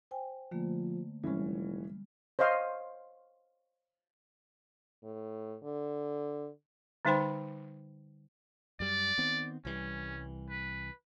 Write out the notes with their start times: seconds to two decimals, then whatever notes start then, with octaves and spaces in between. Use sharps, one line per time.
0.11 C5 G5 G#5
0.52 D3 F3 A3 A#3
1.24 F1 E3 G3 G#3 C#4
2.39 C5 C#5 D#5 F5 C6
5.04 A2
5.63 D3
7.05 D3 G3 D#4 C5 G5 B5
8.80 F#2 G3 D5
9.18 D#3 B3 C4
9.65 C2 E3 G3 C#4
10.50 B4